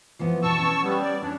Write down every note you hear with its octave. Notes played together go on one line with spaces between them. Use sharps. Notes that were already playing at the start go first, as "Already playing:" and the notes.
E3 F3 B3
B2 A5 C#6 E6
C#4
G3 B3
D5
C#4 D4